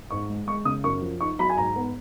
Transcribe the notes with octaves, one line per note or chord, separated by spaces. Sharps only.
G#2 C#6
G#3
G#3 C#6
C#3 D#6
F#2 C#6
F3
D#4 C#6
F#3 B5
G#5
G#2 A#5
B3